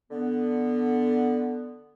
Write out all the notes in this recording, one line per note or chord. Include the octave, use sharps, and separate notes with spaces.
D3 B3